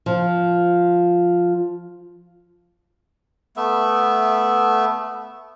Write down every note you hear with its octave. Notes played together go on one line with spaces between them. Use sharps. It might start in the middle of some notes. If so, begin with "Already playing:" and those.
F3
A3 B3 E5